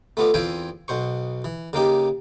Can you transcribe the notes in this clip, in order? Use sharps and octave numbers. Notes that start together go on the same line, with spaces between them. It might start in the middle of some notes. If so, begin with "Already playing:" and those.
A3 B3 F4 D5
E2 C4 F4 E5 G5 G#5
B1 B2 C5 C#6
E3
C#3 A#3 D#4 G4